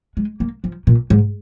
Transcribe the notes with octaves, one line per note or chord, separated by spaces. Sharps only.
G#3
A#3
F3
A#2
G#2